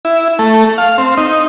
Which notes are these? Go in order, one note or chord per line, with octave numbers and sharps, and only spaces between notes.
E4
A3
F5
C4
D#4